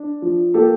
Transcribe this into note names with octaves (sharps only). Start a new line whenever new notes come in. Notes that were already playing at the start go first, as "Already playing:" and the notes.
Already playing: D4
F3
A#3 G4 A4